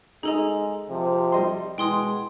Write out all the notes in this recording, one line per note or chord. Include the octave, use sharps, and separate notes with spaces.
G#3 D#4 G#4 A4 D#5 A#5
C3 F3
G3 D#5 C6
B2 E3 G#3 G5 C6 D#6